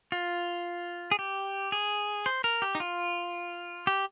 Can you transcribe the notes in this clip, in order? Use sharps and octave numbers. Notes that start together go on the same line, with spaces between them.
F4
G#4
G4
G#4
C5
A#4
G4
D#4
F4
G4